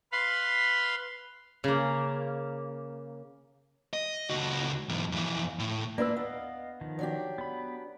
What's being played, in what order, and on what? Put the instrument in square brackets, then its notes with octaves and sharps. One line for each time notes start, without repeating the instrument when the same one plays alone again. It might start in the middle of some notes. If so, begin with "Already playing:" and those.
[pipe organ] B4 F5 B5 C6
[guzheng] C#3 A#3
[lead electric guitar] D#5
C#2 F#4
E2 G#2
F2 E3
A2
[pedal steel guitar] A#3 F4 E6 [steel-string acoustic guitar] D4 E4 B4
[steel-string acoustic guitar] B3 [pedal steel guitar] D#5 F5
[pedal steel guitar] D#3 F3
[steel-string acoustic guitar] F#3 D4 G4
[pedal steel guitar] B3 B5